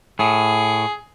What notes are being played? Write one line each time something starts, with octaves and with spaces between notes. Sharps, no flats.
A2 G#4